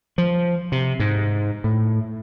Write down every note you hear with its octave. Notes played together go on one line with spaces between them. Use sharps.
F3
C3
G#2
A2